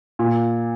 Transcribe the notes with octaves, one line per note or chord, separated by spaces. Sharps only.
A#2